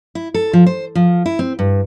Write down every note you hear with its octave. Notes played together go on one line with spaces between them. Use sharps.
E4
A4
F3
C5
F3
E4
C4
G2